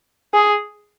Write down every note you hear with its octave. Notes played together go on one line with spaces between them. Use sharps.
G#4